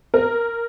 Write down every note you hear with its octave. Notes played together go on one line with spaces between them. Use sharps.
A#4